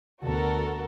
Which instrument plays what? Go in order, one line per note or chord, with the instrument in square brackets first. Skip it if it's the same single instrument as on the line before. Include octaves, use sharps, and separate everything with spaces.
[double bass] D2 B3 [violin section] F#4 A4 A#4